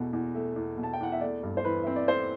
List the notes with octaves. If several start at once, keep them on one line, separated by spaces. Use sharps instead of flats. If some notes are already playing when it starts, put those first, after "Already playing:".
Already playing: E2 B2 A3
E2
A3
E2
B2
A5
G5
E2 F#5
E5
A3 D5
G2
C5
E3 B4
C4 E5
D5
A3 C5